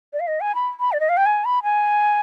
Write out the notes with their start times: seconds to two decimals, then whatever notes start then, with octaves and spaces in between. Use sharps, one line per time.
0.13 D5
0.20 F5
0.27 D#5
0.41 G#5
0.55 B5
0.80 B5
0.92 D5
1.00 D#5
1.09 F5
1.17 G5
1.26 G#5
1.45 B5
1.63 G#5